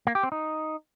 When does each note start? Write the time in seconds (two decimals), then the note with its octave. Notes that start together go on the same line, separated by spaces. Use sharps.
0.07 A#3
0.15 G4
0.23 C4
0.32 D#4